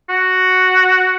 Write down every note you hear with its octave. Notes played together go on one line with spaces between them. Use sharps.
F#4